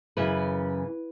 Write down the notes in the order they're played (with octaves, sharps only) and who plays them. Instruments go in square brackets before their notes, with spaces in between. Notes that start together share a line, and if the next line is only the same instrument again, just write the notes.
[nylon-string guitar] F#2 C#3 E3 B4